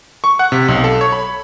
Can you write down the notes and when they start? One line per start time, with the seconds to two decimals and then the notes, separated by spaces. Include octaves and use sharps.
0.24 C#6
0.39 F#5
0.52 C3
0.68 B1
0.84 A4
1.01 C#5
1.12 B5